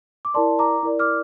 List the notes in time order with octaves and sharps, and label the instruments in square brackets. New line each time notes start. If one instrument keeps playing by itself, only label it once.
[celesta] D6
E4 A#4 D5 A5 C6
A#5 D6
E4 A#4 D5
D6 F6